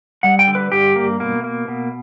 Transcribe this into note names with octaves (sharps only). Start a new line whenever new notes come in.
G3 F#5
G5
D3
B4
G2 G4
A#3
B2 A#3
A#3
B2